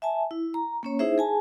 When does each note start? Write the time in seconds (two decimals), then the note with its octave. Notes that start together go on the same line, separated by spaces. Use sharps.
0.02 E5 G#5 A5
0.31 E4
0.54 A#5
0.83 A#3 C#4 C#5
0.99 D#4 E4 G#4 C5 E5
1.18 G#4 G#5 A5